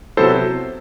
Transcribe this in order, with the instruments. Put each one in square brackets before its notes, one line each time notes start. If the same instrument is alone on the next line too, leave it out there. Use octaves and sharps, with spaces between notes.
[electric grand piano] C3 F#3 B3 E4 A4 C5